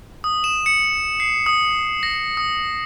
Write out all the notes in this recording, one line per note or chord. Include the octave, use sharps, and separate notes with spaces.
D#6
E7
C#7
C7
D#6
A#6
D#6